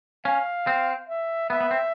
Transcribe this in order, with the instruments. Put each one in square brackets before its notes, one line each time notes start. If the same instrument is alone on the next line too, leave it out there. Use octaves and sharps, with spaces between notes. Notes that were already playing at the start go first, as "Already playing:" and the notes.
[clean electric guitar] C#4 [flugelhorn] F5
[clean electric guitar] C4
[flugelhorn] E5
[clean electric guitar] B3 [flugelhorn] E5
[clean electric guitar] B3
C4